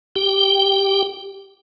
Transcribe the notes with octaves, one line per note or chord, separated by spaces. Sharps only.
G4 G5